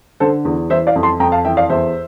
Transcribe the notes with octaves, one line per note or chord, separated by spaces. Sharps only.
D3 A4 C5
E2
E3 C5 E5
D5 F5
F2
A5 C6
F2 G5 A#5
F5 A5
E3 E5 G5
D5 F5
E2 C5 E5